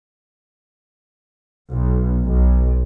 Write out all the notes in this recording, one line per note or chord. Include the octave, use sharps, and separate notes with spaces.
B1
B1